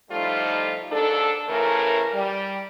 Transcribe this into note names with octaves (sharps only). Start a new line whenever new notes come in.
A2 F3 G3 A3 D#4 F4
D#2 G#2 D4 A4
A2 C#3 E3 A3 A#4
G3